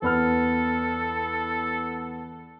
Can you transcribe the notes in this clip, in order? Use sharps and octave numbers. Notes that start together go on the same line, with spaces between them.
E2 B3 A4 F6